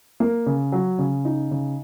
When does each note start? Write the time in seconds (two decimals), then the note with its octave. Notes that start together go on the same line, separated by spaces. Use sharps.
0.20 A#3
0.46 C#3
0.72 F#3
0.99 C#3
1.25 D#4
1.51 C#3